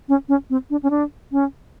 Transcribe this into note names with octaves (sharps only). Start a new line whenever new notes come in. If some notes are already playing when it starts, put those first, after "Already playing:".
C#4
C#4
C4
D4
C#4
D4
C#4